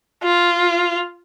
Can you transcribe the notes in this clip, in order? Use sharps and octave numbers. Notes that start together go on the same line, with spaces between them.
F4